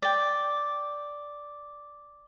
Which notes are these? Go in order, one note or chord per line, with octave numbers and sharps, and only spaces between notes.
D5 G5